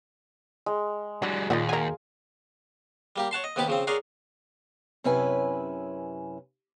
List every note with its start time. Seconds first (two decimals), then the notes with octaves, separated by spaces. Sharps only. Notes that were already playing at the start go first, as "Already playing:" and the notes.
0.66 G#3
1.22 E3 G3 D4 F#4
1.50 D#2 A#2 D#4 F4 F#4 F5
1.69 F#4 A#4 G#5
3.16 G3 A#3 G4
3.31 C#5 F#5 A5 C6
3.44 D#5
3.56 D#2 C3 B3 G4 B5 D6
3.68 C#3 F3 C4
3.87 G#4 A#4 C#5 D5 F#5 C6
5.04 F#2 C3 C#4 E4 B4 G#5